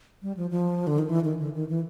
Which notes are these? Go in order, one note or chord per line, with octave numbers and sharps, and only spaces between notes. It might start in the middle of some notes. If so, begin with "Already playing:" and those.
G3
F3
F3
D3
D#3
E3
D#3
D3
D#3
E3